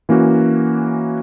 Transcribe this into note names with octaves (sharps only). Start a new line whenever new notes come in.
E3 A#3 C#4 F#4